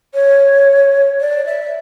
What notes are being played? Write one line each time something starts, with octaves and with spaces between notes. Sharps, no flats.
C#5
D5
E5